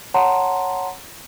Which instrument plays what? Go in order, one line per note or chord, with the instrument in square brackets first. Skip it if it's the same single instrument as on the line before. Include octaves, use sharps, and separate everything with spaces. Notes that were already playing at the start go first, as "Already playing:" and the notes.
[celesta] C#5 F#5 A5 A#5 C6